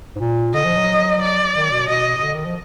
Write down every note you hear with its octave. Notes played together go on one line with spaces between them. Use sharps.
G#2
A#2
D3 D#5
F3
F#3
D5
D#3
B2
B2 D#5
B2
D3
D#3
F3